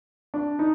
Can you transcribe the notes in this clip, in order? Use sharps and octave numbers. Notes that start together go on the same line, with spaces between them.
D4
D#4